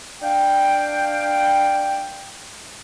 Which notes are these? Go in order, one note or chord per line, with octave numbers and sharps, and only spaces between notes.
D4 F5 G5